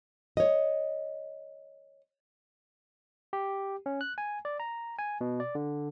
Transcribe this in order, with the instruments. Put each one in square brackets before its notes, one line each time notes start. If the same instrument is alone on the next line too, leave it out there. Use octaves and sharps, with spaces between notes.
[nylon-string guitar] C#5 D#5
[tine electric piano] G4
C#4
F#6
G#5
D5
A#5
G#5
B2
D5
D3